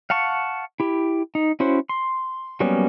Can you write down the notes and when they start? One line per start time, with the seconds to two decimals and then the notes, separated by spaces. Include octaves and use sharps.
0.10 F5 F#5 A5 C#6
0.80 E4 G4
1.35 D#4
1.60 C#4 E4 F#4 C5
1.89 C6
2.60 F#3 G3 A#3 B3 C#4